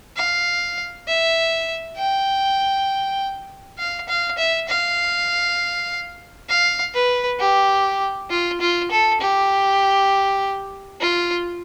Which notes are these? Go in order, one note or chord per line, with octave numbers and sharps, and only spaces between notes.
F5
E5
G5
F5
F5
E5
F5
F5
B4
G4
F4
F4
A4
G4
F4